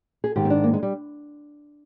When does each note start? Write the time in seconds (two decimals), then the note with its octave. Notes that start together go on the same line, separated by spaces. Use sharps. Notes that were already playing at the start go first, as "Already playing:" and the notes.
0.24 G#4
0.36 G#2 D#3 G4
0.45 C4
0.50 D4
0.64 A#3
0.73 G#3
0.83 G3